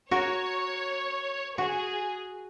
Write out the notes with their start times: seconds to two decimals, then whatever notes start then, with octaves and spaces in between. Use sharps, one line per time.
0.11 F#4 A#4 C#5
1.58 F#4 G#4